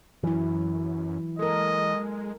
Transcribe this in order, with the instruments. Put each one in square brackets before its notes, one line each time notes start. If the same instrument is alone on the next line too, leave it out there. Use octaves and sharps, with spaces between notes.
[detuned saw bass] F#2 [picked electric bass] E3 [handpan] F#3 E4
[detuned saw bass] G#3 [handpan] A4 A#4 [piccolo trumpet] D#5